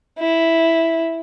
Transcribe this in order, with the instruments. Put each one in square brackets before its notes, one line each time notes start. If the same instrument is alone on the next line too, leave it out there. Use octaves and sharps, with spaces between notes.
[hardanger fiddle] E4